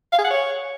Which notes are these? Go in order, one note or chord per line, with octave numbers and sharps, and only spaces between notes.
F5
G#4
F#5
C#5